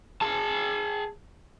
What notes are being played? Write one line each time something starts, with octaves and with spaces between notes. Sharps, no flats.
G#4 A5